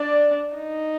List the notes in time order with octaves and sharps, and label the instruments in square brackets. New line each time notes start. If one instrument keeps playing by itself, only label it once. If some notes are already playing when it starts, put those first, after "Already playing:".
Already playing: [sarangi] D4 [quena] D5
[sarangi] D#4